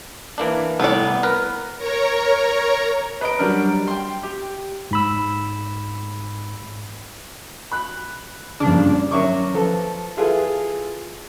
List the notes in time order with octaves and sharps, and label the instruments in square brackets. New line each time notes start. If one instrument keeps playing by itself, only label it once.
[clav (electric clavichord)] E3 A#3 D4
[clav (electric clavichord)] C2 A2 [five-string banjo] B3 D5
[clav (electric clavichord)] A#4 B4
[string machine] A#4 C#5 A#5
[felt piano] B4 D#5 A#5 D7
F#3 G3 D4 A#4
G5 C6
G4
[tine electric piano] G#2 B5 E6
[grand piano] B5 F#6
[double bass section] G2 F3 A#3 [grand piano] C#3 [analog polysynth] D4
[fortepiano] F#3 C#4 A#4 E5 C#6 D6
F3 A4 B4
E4 F4 G#4 A4 B4